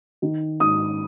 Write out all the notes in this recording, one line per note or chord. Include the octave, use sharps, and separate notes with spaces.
D#3
G#2 D#6